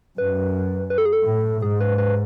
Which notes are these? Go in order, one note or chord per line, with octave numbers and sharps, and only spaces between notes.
F#2 B4
B4
A4
G#4
A4
A2
G#2 G#4
B4
B4